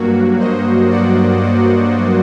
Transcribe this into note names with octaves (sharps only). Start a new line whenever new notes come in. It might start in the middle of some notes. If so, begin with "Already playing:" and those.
Already playing: G2 F#3 A#3 F#4
C5 D#5
D5 F#5
D5 F#5